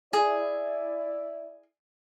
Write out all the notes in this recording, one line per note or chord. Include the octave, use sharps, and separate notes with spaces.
E4 G#4 D5